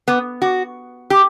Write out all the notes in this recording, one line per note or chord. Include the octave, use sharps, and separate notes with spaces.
B3
F#4
G4